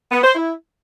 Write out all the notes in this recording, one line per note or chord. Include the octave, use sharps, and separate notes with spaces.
B3
C5
E4